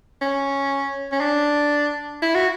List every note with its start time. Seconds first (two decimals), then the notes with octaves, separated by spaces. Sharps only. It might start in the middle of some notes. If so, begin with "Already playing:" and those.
0.21 C#4
1.12 C#4
1.21 D4
2.22 E4
2.35 F#4